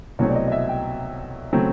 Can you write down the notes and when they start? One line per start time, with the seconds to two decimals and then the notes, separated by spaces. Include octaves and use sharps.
0.19 C2 B2 F#3 A3 C4 C#5
0.29 D5
0.36 D#5
0.48 D#5
0.52 E5
0.69 G5
1.53 C#3 F#3 A3 C4